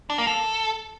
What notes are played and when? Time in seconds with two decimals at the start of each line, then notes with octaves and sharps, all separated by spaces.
0.10 D4
0.18 A#3
0.27 A4